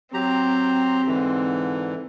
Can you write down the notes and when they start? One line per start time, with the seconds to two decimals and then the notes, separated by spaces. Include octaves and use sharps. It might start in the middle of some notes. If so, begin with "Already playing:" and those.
0.14 F#3 C4 G4 A#5
1.07 G#2 D3 E3